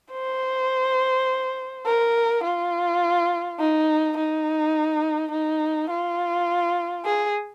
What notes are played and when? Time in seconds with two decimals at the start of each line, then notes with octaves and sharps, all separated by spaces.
0.12 C5
1.86 A#4
2.44 F4
3.59 D#4
4.17 D#4
5.31 D#4
5.90 F4
7.05 G#4